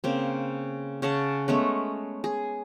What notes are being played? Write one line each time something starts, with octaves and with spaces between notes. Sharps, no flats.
C#3 A#3 C4
C#3 G#4 F#5 A5
G#3 A3 B3 C#4
G#4